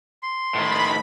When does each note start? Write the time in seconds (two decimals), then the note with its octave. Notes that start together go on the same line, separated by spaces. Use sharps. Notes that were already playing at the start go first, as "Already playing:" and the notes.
0.23 C6
0.55 A2 D#3 B5